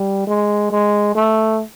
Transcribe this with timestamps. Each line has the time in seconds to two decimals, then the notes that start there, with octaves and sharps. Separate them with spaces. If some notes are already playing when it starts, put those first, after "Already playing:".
Already playing: G3
0.27 G#3
0.71 G#3
1.15 A3